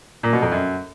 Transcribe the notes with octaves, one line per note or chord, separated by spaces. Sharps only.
A#2
B2
F2
F#2